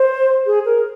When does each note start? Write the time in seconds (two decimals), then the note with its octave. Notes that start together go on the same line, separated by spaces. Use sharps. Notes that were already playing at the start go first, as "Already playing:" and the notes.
Already playing: C5
0.46 G#4
0.65 A#4